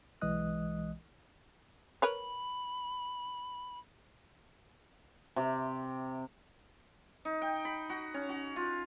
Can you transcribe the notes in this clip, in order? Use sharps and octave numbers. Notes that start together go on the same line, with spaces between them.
B1 E3 G#3 D#5 D#6 F#6
A#4 B4 C#5 B5
C3 G4
D#4
G5
B5
F#4
C#4
F#4
F4